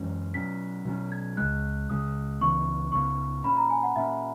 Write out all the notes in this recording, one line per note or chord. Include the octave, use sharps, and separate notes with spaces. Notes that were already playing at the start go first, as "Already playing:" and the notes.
Already playing: F#2 E3 G#3 C#4
B2 F#3 C#4 B6
B2 F#3 C#4
G#6
C#2 C#3 G#3 F#6
C#2 C#3 G#3 D#6
C#2 C#3 E3 B3 C#6
C#2 C#3 E3 B3 C#6
A#2 A#3 C#4 B5
A#5
G#5
F#5
A#2 A#3 C#4 E5